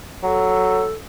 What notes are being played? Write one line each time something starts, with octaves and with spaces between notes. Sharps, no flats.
F#3 A4